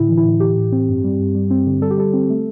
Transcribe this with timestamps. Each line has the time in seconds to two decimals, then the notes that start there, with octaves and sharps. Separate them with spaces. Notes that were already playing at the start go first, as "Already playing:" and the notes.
Already playing: A2 D3 E4
0.09 E3
0.18 E4
0.25 A2
0.40 E3 G4
0.57 A2
0.72 C4
0.89 G2
1.04 G3
1.20 G2
1.35 G3
1.51 C4
1.66 D3
1.82 G3 A4
1.91 G4
1.98 G3 A4
2.13 C4
2.30 A3